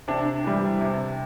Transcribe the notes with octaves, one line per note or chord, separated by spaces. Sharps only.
C3 D4
E3 G3
C3